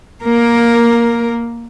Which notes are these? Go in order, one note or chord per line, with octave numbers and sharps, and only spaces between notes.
A#3 A#4